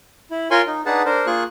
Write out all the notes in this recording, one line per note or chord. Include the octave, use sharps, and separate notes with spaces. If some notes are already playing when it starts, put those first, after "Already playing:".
E4
F4 A#4 C#5 G#5 C6 C#6
D#4
D4 D#4 G#4 B4 F#5 A5
D4 A#4 C5
A#3 F4 G#4 C#6 F#6